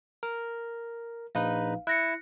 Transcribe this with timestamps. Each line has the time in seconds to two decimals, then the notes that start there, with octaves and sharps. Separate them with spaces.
0.23 A#4
1.35 A#1 D#4 B4 F5
1.87 E4 F#6 A#6 C#7